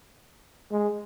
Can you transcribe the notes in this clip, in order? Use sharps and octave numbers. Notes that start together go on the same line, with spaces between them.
G#3